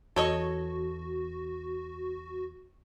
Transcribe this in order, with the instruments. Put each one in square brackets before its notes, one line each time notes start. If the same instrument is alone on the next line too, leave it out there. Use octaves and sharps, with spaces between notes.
[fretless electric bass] E2 [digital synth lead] F#4 [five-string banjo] A4 C#5 D#5